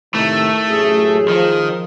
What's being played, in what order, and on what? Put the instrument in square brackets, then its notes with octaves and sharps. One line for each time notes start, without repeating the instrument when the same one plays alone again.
[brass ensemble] A2 C3 D#3 [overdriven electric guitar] A3
[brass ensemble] A1 F#2 [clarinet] G#4
[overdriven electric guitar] D#3 [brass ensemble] F3